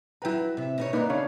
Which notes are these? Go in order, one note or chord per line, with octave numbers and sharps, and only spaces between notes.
F#3 E4 B4 G5 A#5
C3 E5
B2 D#4 C#5
G2 A#3 D4 D#4 B4
C#3 D4 C#5 F5